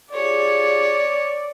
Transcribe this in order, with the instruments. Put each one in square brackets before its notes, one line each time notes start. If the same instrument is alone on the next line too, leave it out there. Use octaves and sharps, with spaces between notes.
[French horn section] F4 G4 G#4 [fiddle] C#5 [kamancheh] D5